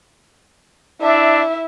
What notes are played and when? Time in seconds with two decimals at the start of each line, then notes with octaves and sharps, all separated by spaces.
1.01 D4 E4 E5